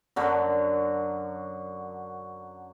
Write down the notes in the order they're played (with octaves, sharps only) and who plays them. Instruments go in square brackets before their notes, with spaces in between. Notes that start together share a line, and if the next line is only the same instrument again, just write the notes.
[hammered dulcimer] F#2 D3 F#3